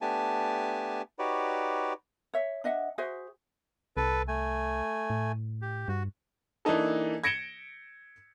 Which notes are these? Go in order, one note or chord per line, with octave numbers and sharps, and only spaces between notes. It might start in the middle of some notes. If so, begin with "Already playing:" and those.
A3 B3 D4 G4 G#5 A5
D#4 F#4 G4 B4 C#5 D5
C#5 E5
D4 D#5 E5 F#5
F#4 G#4 C5 E5
C2 A4 B4
A3 G#5
A2
G4
G2 F#4
E3 A#3 D4 D#4 A4
G#6 A#6 C#7 D7 E7 G7